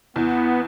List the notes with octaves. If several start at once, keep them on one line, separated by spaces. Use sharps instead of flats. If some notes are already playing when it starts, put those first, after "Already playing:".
E2 B3